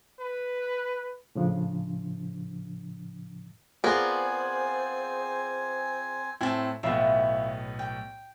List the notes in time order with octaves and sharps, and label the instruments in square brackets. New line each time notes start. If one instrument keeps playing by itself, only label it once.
[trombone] B4
[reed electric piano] A2 C#3 F3 D4
[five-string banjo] B3 A#4 [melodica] C4 G#5 [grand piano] F4 G#4 D5 [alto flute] C5
[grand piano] A2 C4 E4 [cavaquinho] G#5 A5
[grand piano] B1 A2 B3 [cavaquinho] E4 F4 E5
[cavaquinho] G5